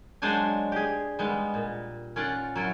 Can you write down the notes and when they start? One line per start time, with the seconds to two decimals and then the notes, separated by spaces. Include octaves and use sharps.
0.22 F#3 G#3 D4 C5 D5 G#5
0.72 G4 G#4
1.19 G3 G#3 B3
1.54 A#2
2.16 C#4 F4 D5 F#5
2.56 F#3 E4 F4